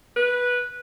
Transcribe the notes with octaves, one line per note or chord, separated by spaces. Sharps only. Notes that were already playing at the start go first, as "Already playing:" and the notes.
B4